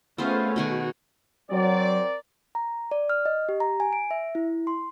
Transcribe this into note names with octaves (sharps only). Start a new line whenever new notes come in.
A3 B3 C#4 F4 G#4 C5
B2 D#3 F#4 G#5
F#3 C4 A#4 D5
A#5
D5
F6
D#5
G4
A#5
G#5
D7
E5
E4
C6